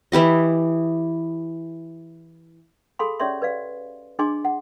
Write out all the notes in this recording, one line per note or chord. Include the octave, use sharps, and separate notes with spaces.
E3 E4 G4 D#5
G#4 A4 F5 G#5 B5 C6
C#4 G4 C#5 D5 E5 C6
B4 D5 F5
D4 G#4 D#5 G#5 C6 D6
F#5